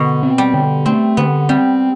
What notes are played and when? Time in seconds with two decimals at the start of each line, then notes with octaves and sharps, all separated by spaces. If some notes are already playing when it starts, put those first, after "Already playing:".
Already playing: B2 D3
0.23 C4
0.38 G3
0.54 D3
0.86 A3 C4
1.17 D3 B3
1.49 G3 C4